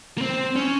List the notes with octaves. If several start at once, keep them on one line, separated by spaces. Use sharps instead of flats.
A#3
C4
C#4